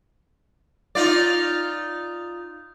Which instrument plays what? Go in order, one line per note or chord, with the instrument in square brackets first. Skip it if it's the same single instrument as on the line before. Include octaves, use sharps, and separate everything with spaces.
[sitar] D#4 F4 D5